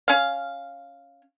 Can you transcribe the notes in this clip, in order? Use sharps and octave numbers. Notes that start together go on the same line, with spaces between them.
C#4 F5